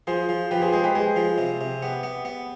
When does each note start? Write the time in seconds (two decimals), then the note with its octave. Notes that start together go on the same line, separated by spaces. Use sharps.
0.07 F3 G#4 C5
0.29 F3
0.51 F3 G4 B4
0.62 G#4 C5
0.72 G#3 G#4 C5
0.83 G4 B4
0.95 G#3 G#4 C5
1.16 F3
1.38 C3
1.61 C3
1.82 B3 G4 B4
2.03 B3
2.25 B3